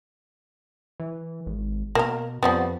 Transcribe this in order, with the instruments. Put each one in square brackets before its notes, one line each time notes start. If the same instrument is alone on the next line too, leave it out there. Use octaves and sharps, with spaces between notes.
[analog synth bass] E3
G#1
[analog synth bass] B2 [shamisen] A#3 A#4
[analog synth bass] F2 [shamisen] F3 G3 B3